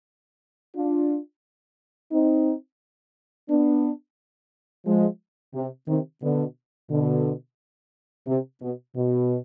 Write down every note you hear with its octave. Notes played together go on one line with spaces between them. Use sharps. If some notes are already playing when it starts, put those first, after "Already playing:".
D4 F4
C4 D#4
B3 D4
F3 G#3
C3
C3 D#3
B2 D3
B2 D3
C3
B2
B2